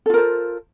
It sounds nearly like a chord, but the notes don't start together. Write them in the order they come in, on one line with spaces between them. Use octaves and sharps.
A4 F4 A#4 C5